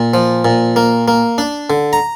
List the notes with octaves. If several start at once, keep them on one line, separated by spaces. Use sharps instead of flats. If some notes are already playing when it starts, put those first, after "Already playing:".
Already playing: A#2
F3
A#2
A#3
A#3
D4
D3
A#5